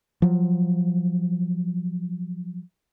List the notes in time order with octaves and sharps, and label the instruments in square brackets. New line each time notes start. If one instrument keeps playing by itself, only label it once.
[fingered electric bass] F3 F#3